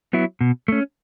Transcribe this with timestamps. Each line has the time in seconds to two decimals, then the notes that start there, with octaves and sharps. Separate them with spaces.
0.13 F#3 B3 E4
0.41 B2
0.68 A3 C#4